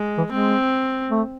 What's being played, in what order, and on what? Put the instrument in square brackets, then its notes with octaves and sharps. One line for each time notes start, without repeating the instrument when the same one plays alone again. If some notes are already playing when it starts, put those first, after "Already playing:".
Already playing: [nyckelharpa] G#3
[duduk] E3
[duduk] G#3 [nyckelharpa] C4
[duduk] A3